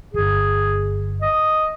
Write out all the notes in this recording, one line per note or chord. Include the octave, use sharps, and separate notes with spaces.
D1 G1 G#4
D#5